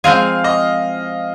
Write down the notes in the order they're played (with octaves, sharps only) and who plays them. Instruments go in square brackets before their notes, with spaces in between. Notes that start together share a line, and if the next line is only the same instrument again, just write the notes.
[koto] F3 G#3 C4 G#4 [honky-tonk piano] F5
[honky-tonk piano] D#5